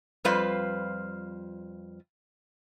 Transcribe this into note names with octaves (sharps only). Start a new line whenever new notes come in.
F2 G3 F4 B4 C5 F5